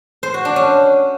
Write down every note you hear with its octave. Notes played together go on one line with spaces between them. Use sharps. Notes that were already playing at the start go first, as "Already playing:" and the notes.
C5
F#4
D4
C#4